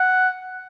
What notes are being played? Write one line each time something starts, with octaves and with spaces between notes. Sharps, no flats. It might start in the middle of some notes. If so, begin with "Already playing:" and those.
Already playing: F#5